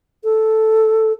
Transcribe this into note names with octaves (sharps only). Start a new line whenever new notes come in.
A4